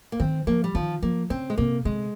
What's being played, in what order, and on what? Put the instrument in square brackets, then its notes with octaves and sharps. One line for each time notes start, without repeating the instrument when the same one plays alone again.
[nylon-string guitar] A#3
[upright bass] D#3 [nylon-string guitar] C4
[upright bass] F3 [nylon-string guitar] A#3
[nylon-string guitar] G3
[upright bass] D#3 [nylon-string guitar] F3
[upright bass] F3 [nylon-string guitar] A#3
[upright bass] C#3 [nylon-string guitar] C4
[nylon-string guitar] G#3
[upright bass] C3 [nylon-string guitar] A#3
[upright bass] C3 [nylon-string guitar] G#3